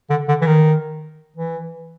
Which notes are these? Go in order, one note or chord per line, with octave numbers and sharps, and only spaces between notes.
D3
D3
E3
D#3
E3